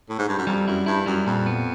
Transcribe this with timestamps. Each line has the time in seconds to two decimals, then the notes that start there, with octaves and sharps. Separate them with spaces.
0.10 A2
0.19 G#2
0.29 G2
0.39 F#2
0.47 F2 G3
0.68 F#2 E4
0.86 G2 E4
1.06 F#2 G3
1.26 F2 A#2
1.46 B3